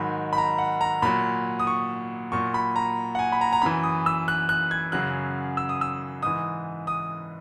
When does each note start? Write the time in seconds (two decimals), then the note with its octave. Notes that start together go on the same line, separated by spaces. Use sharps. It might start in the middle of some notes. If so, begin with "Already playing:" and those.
Already playing: G#2 D#3 F#3 B5
0.33 B5
0.38 A#5
0.58 F#5
0.81 A#5
1.02 A#2 F#3 B5
1.60 D#6
1.67 C#6
2.32 A#2 F#3 C#6
2.54 B5
2.76 A#5
3.15 F#5
3.19 G#5
3.32 B5
3.41 A#5
3.52 A#5
3.62 F#2 E3 B5
3.83 D#6
4.06 E6
4.28 F#6
4.49 F#6
4.71 G#6
4.92 F#2 C#3 F#3 F#6
5.57 E6
5.69 D#6
5.81 E6
6.22 G#2 E3 D#6
6.87 D#6